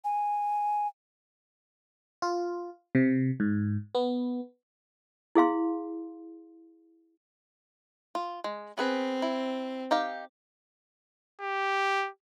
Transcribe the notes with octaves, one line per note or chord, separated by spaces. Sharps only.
G#5
F4
C3
G#2
B3
E4 G#4 F5 C6
F4
G#3
B3 C4 G#4 B4
E4
D#4 G4 F5
G4